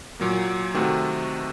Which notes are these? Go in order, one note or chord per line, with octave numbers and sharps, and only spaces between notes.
A#2 F#3 A#3
C3 D#3 A3 C4 F#4